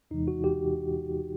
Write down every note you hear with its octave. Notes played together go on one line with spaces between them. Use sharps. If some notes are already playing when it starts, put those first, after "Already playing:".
E2 C3 E3 G#3 D#4
F#4
G4